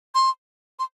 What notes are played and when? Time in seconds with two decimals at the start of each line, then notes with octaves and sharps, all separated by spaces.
0.14 C6
0.79 C6